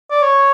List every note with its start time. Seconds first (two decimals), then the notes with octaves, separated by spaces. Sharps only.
0.11 D5
0.22 C#5